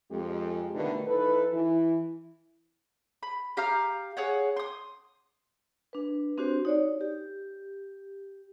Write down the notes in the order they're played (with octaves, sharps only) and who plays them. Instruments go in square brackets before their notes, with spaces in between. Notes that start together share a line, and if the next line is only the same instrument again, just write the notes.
[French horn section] F2 G#3 G4
B2 D3 D#3 G3 A3 B3
E3 D#4 A4 B4
E3 E4
[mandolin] B5
G4 F5 A#5 F6
G#4 C#5 F#5
C6 D#6
[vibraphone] D4 B4
C4 D4 F#4 G4 C5
D#4 C#5 D5
G4